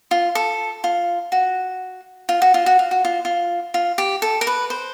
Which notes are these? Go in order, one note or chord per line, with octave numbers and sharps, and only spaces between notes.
F4
A4
F4
F#4
F4
F#4
F4
F#4
F4
F#4
F4
F4
F4
G4
A4
A#4
B4
C5